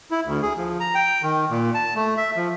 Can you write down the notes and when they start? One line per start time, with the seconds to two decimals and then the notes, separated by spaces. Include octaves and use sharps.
0.11 E4
0.25 D2
0.42 G#4
0.57 F3
0.80 A#5
0.95 G5
1.23 D#3
1.50 A#2
1.74 A5
1.96 A3
2.17 E5
2.36 F3